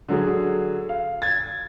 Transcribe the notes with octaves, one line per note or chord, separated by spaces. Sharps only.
D3 F#3 G#4
F5
G#6 A6